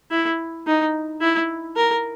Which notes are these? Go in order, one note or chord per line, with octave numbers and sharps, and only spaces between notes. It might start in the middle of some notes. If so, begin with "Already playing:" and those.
E4
D#4
E4
A#4